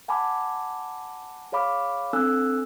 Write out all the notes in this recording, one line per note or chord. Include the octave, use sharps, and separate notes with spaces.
F#5 G#5 A5 B5 D6
G#4 C#5 F5 B5 D6
C4 D4 A4 G#5 E6 F#6